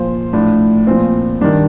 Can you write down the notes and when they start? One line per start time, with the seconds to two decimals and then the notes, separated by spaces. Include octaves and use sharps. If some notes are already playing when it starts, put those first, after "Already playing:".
Already playing: A#2 F3 C5
0.33 A2 F3 D4
0.87 A#2 F3 C4
1.41 G2 D#3 D4